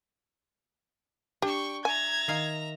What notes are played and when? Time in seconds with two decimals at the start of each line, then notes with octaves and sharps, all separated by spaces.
1.42 D4 G4 G5 C#6
1.85 E5 G#5 A#5 G#6
2.28 D#3 F5